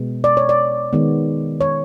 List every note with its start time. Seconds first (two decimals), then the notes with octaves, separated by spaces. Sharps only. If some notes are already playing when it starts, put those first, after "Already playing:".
Already playing: B2 G#3 B3
0.24 D5
0.37 C#5
0.49 D5
0.93 D#3 G#3 B3
1.61 C#5